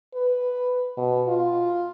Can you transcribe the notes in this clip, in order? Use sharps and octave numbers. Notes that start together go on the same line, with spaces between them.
B4
B2
F4